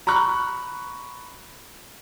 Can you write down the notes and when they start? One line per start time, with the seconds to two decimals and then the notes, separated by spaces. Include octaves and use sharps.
0.07 A#5 B5 C#6 F#6